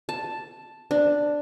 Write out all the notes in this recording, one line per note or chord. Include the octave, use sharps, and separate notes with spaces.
A5
D4